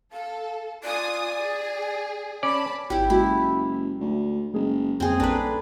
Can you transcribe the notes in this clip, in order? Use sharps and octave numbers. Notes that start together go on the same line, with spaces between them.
A4 F5
F4 D5 G#5 D#6
G#4
C#4 D5 A5 B5
G#1 E4 G4 G5
F#1 G#3 E4 F#4
D2
F#1 G#3 G#4
D#1 F2 C4 G#4
A#1 D4 A4 B4 A#5